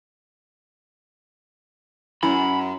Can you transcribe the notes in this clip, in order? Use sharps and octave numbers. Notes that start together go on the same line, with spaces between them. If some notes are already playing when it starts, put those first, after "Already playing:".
F#2 E4 G#5 A#5 B5